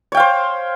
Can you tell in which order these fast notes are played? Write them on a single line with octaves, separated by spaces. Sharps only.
C#5 G5 F5 C5